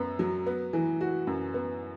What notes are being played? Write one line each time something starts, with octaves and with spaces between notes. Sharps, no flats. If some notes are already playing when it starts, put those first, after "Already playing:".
Already playing: F#2 B3
F#3
B3
E3
F#4
F#2
B3